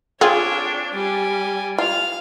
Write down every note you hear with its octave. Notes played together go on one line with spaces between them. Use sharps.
C4 D4 F4 G#4 C#5
G3 G4 G#5
F4 F5 F6